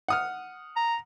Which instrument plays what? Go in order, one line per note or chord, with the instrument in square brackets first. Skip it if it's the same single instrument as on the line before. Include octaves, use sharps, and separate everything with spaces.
[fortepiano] F#5 D#6 F6
[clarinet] A#5